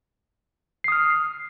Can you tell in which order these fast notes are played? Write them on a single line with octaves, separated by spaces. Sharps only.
C7 D#6 F6